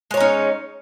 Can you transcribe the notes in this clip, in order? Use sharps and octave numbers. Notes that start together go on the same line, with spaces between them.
G#3 C#4 D#4 C#5